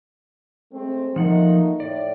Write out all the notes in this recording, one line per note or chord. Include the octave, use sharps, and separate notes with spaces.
G#3 A3 C4
F3 A3 A#3 D#4 F#5
A2 D5